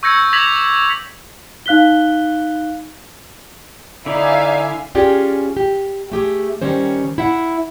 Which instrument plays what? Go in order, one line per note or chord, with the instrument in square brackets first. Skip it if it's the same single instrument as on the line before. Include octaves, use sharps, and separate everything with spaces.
[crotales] C#6 E6 G6 G#6 A#6 C#7
D6 G#6 A#6 B6 F7 F#7
[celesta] D#4 F5 F#6 B6 G7
[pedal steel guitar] D3 E4 [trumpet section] D#4 D5 [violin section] E5 F5 G#5
[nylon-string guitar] C#4 F4 G4 G#4 D5
G4
A3 G4 G#4
D#3 G3 C#4 C5
E4 E5 F#5